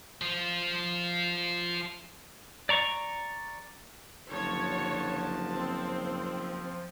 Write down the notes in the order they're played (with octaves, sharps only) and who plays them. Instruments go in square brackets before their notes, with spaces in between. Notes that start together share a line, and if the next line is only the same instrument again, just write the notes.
[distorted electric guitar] F3 F4
[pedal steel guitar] D5 A#5 C#6
[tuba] F#1 [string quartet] D3 F#3 A5 [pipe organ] F3 [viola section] C#5
[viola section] C4